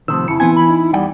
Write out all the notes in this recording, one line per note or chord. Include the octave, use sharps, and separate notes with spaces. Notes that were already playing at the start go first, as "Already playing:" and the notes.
A2 C3 D#3 F3 E6
F2 C#3 E4 C#7
E3 B3 C4 B4 G#5 G#6
B5
D#4
E2 G3 F#5 G5